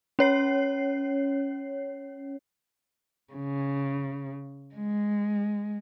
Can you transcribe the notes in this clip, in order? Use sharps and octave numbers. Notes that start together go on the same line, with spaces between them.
C#4 C#5 C7
C#3
G#3